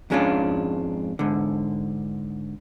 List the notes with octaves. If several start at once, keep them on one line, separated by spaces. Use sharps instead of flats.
F2 G#2 G#3 C#4 D4 F4
G#2 D3